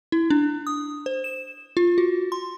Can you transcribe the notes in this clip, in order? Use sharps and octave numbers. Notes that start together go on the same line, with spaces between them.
E4
D4
D#6
C5
E7
F4
F#4
C6